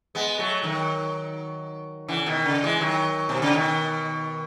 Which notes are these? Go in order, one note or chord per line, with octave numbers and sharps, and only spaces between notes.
G#3 B3
F#3 A3
D#3 F#3
C#3 E3
B2 D#3
C#3
E3 G#3
D#3 F#3
B2
C#3
B2 D#3